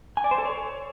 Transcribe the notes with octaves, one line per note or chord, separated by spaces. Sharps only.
G#5
D5
C5
A4
C#5